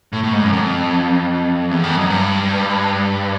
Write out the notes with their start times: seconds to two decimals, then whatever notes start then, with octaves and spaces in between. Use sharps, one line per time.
0.13 A2
0.24 A2
0.33 G#2
0.43 F#2
0.53 F2
1.71 E2
1.83 F2
1.97 F#2
2.10 G2